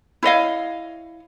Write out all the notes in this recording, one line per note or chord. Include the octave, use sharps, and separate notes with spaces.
E4 C#5 D#5 F5